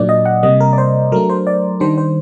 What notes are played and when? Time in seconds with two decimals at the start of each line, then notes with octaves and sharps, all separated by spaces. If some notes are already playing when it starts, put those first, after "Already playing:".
Already playing: A#2 F#3 A#3 D4 D5
0.09 D#5
0.25 F#5
0.43 C3 G3 A#3 D#5
0.61 A#4
0.73 D5
0.78 C5
1.12 F#3 A3 D4 A#4
1.30 C5
1.47 D5
1.80 D#3 G3 D4 C5
1.98 C5